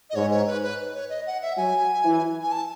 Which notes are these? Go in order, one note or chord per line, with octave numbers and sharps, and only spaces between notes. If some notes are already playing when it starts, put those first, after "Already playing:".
D#5
G#2 C#5
C#5
B4
B4
C#5
D#5
F#5
E5
F#3 G#5
E3
G#5
A5